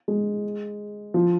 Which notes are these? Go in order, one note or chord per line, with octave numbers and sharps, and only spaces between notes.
G#3
F3